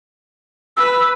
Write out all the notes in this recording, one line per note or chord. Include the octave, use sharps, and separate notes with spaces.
B4 E6